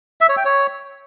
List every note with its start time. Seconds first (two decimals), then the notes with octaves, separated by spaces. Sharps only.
0.21 E5
0.29 C#5
0.37 G5
0.45 C#5